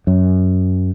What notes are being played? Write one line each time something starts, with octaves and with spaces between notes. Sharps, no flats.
F#2